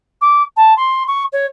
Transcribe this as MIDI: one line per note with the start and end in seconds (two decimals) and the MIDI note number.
0.21 0.42 86
0.56 0.76 81
0.77 1.03 84
1.07 1.24 85
1.32 1.46 73